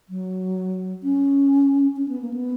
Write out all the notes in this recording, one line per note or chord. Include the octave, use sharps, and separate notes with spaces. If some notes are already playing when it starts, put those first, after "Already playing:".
F#3
C#4
C#4
B3
A#3
B3